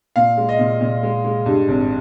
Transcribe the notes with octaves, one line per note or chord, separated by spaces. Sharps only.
A#2 F5
G#3
D#5
A#2
A#2
G#3
G#3
G2
G#1